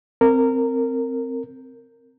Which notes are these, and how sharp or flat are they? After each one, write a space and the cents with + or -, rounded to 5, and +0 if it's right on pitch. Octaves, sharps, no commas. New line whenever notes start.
C4 +0 A#4 -20